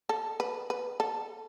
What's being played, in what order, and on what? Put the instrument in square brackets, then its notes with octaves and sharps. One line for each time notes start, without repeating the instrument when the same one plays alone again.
[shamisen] A4
B4
B4
A4